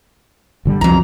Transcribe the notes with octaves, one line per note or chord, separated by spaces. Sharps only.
G1 D3 G3
C2 F2 F#3 A#5